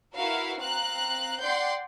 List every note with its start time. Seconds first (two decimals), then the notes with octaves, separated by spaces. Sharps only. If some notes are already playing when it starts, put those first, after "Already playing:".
0.15 E4 F#4 A#4 B4 E5 F5
0.58 C4 F5 A#5 F#6
1.41 D5 F#5 G5 C6 G6